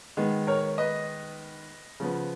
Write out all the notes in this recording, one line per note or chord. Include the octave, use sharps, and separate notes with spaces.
D#3 G#3 B3
A#4 C#5
B4 D#5
C#3 F3 B3